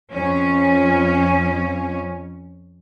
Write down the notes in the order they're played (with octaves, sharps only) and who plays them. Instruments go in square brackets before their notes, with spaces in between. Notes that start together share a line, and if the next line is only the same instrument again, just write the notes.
[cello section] F2 C#4